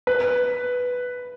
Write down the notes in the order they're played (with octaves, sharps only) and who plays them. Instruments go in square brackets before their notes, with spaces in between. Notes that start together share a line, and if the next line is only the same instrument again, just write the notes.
[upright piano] B4